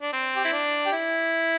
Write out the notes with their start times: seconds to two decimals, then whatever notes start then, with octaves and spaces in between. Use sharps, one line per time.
0.02 D4
0.13 C4
0.36 G4
0.45 E4
0.53 D4
0.86 G4
0.93 E4